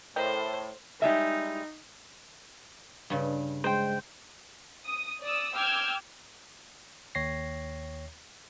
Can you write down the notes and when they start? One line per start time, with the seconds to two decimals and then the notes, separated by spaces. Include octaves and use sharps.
0.16 A2 A#4 C5 D#5 G5
1.02 G3 G#3 D#4 E5
3.10 G2 C#3
3.64 G#3 C5 G5
4.87 D#6
5.22 D5 D#6 E6
5.55 G5 D6 E6 F6 G6 G#6
7.15 D#2 C#5 G5 A#6 C7